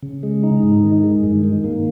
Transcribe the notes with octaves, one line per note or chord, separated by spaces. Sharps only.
C#3
G#3
D#4
G#2
D#3
G#3
G2
D#3
A#3